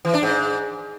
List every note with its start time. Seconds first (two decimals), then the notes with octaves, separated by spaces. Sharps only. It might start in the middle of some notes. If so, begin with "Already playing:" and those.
0.05 E3
0.14 D4
0.23 G#2